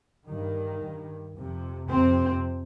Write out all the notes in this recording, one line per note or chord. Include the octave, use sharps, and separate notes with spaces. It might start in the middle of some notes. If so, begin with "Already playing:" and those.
G2 D#3
G2
F2 C3
F2 C3 C4